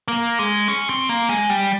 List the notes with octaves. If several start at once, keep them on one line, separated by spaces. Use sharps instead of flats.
A#3
G#3
C#4
C4
A#3
G#3
G3